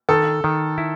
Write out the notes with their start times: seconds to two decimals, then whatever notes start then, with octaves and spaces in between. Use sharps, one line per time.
0.09 D#3 A4
0.44 D#3
0.78 E4